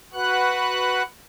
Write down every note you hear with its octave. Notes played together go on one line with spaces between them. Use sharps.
F#4 B4 F#5 F#6